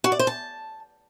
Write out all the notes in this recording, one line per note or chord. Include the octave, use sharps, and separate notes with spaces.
F#4
D5
C5
A5